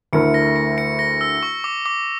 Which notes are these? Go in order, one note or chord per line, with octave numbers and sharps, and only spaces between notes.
D2 D3 A3 E4 A#4 C#7
A#6
C#7
C#7
A#6
E6
C#6
D6
D6